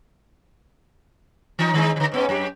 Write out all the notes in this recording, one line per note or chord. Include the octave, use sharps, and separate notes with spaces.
E3 D#4
D#3 G#3 D#4
D3 D#3
G#2 B3 C#4
F#2 G4